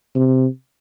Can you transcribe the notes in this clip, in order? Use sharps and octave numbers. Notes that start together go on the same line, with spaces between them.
C3